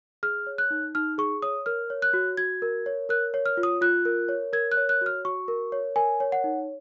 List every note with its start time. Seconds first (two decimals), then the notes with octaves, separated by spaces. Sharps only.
0.23 G#4 F6
0.47 C#5
0.58 F#6
0.71 D#4
0.95 D#4 F6
1.18 G#4 C#6
1.42 C#5 D#6
1.66 A#4 F6
1.90 C#5
2.02 F#6
2.14 F#4
2.37 F#4 G#6
2.62 A#4
2.86 C#5
3.09 A#4 F#6
3.34 C#5
3.46 F6
3.57 F4
3.63 D#6
3.81 F4 F#6
4.05 A#4
4.29 C#5
4.53 A#4 G#6
4.72 F#6
4.77 C#5
4.89 F#6
5.01 F#4 F6
5.25 F#4 C#6
5.48 A#4
5.72 C#5
5.96 A#4 G#5
6.20 C#5
6.32 F#5
6.44 D#4